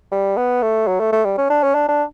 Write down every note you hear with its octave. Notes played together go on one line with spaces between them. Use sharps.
G3
B3
A3
F#3
A3
A3
G3
C#4
D4
C#4
D4
D4